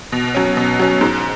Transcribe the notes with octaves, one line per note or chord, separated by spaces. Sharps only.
B2
F#3 C#4
B2
F#3 C#4
G#2